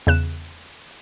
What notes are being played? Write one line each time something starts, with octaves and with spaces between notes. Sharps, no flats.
E2 C#3 F#6 E7